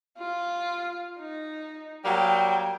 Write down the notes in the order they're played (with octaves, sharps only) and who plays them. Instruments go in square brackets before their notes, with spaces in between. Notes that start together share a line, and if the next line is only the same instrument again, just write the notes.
[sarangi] F4
D#4
[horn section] F#3 G3 A#3 [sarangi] G5